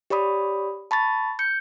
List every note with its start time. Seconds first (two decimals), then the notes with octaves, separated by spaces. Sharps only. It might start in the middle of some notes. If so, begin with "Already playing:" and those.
0.10 G4 C#5 D5 B5 D#6
0.91 A5 B5 C#6 A6
1.39 G6 C#7